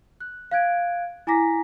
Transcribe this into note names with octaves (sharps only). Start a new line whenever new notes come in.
F#6
F5 F#6 G#6 D7
E4 G#5 A#5 D6 A#6 B6